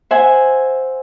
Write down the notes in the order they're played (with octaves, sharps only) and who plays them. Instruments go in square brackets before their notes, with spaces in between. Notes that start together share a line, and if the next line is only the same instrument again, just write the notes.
[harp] C5 E5 F#5 G#5